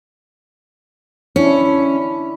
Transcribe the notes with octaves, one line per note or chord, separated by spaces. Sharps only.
C#4 D4 E4